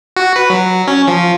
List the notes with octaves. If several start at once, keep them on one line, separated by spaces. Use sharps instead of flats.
F#4
B4
F#3
C#4
F3